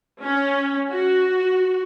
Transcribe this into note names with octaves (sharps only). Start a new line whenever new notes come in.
C#4
F#4